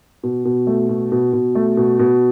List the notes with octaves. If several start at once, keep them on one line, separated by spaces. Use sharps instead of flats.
B2
B2
A3
B2
B2
B2
A3
B2
B2